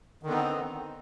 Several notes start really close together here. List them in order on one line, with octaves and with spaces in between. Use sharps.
D#3 D3 B3 D#4 C4